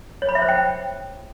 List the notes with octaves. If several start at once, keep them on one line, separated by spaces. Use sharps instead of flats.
C#5
B5
E5
C5
G5